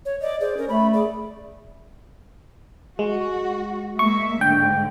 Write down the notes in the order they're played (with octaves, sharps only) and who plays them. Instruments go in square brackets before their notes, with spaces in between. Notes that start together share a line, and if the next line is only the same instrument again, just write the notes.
[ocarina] C#5
[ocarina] D5 [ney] D#5
[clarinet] G#4 [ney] C5 [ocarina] D5
[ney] C#4 [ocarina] A#4
[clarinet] A3 [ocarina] B5
[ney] G#4 [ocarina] D5
[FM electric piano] G#3 [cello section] F#4
[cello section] G#3 A#3 E5 [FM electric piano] C#6
[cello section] G#2 D3 [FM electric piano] G5